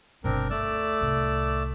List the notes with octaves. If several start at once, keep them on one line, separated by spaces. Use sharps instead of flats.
G1 B2 C4 D4 A#4
D2 A3 D5 E6
C2 A2